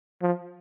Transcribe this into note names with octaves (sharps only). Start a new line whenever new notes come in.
F3